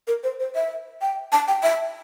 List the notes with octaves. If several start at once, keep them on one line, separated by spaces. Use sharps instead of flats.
A#4
C5
C5
E5
G5
A5
G5
E5